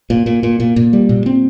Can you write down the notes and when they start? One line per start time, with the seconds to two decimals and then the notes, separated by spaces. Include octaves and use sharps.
0.10 A#2
0.26 A#2
0.43 A#2
0.60 A#2
0.76 A#2
0.93 G3
1.09 A#2
1.26 C4